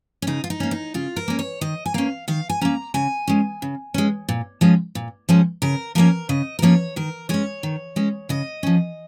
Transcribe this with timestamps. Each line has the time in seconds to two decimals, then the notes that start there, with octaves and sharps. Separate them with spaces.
0.22 C#4
0.27 C#3 D#4
0.44 F4
0.50 D#4
0.60 A#3 C#4
0.71 D#4
0.94 C#3 F4
1.16 A#4
1.28 A#3 C#4
1.39 C#5
1.61 D#3 D#5
1.86 G#5
1.94 A#3 C#4 F5
2.28 D#3 F5
2.50 G#5
2.61 A#3 C#4 A#5
2.94 C#3 G#5
3.28 G#3 C#4
3.62 C#3
3.94 G#3 C#4
4.29 A#2
4.61 F3 G#3 C#4
4.95 A#2
5.29 F3 G#3 C#4
5.62 C#3 A#4
5.95 F3 A#3 C#4 A#4
6.29 C#3 D#5
6.59 A#4
6.62 F3 A#3 C#4 C#5
6.96 D#3 A#4
7.29 G#3 C#4 C#5
7.63 D#3
7.96 G#3 C#4
8.29 C#3 D#5
8.63 F3 C#4